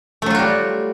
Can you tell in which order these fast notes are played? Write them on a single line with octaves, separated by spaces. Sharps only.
A3 F#3 F4 F#4 G3